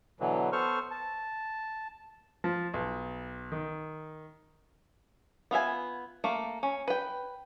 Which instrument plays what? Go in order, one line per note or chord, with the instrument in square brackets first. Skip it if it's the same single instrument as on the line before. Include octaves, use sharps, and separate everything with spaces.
[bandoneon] B2 D3 E3 F#3
B3 A4 C5 C#6 F6
A5
[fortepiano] F3
B1
D#3
[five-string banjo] B3 F4 E5 G#5
A3 A#3
C#4
B4 G5